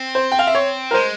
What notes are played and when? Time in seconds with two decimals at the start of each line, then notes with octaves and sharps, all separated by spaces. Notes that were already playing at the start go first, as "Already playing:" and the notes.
Already playing: C4
0.15 C5
0.32 G5
0.39 F5
0.47 E5
0.55 C#5
0.91 A#4
0.94 G#3 C5